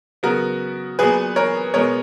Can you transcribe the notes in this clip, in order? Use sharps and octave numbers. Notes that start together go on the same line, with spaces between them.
C#3 F#3 B3 F#4 A#4
A#2 F#3 B3 G#4 B4
A#4 C#5
B2 G#3 B3 A#4 C#5